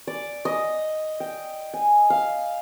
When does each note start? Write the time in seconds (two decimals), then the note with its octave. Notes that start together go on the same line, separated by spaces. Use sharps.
0.07 D5
0.45 D#5
1.20 G5
1.74 G#5
2.10 F5